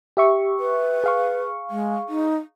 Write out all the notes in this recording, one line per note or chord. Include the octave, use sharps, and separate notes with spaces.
G4 E5 C#6
B4
G#4 F5 C#6
G#3
D#4